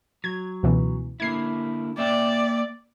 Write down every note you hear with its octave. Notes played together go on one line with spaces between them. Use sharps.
F#3 G#6
C#2 B2 E3
D3 A#3 E4 G#6 C7
A#3 D5 E5 G5